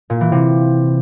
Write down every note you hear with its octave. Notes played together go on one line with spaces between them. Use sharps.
A#2
E3
C3